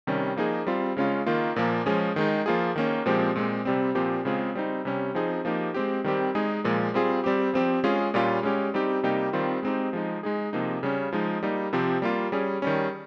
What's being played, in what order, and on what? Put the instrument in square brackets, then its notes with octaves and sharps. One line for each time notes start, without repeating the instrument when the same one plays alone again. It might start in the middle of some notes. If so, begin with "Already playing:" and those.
[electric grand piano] C3 D#3 G3 C#4
F3 A#3 D#4 G#4
G3 C4 F4
C#3 G#3 C#4 F4
D#3 A#3 F4
A#2 F3 A#3
F3 G#3 C#4 G#4
D#3 G#3 D#4
F3 A#3 F4 G#4
D#3 A#3 C#4
A#2 F3 G#3 C4 G4
A#2 G#3 C4
C3 G3 C4
A#2 F3 C4 G4
C#3 G#3 C4 F4 G#4
G3 C4 D#4
C3 G3 C#4
F3 C4 D#4 G#4
F3 A#3 D#4 G4
G#3 C4 G4
D#3 G3 C4 G4
G#3 D#4 G#4
A#2 F3 G#3
G3 C4 F4 G#4
G3 C4 G4
F3 C4 G4
G#3 C#4 F4 G#4
A#2 G3 C#4 F4
G#3 C#4 G4
G3 C4 D#4 G4
C3 G3 A#3 D#4 G4
D#3 G3 C4 F4
G#3 C4 D#4 G4
F3 G#3 D#4
G#3 D#4 G#4
C3 F3 A#3 D#4
C#3 G3 C#4
F3 G#3 D#4
G3 A#3 D#4
C3 F3 C4 G4
G3 A#3 F4
G3 C#4 G#4
D#3 G3 C#4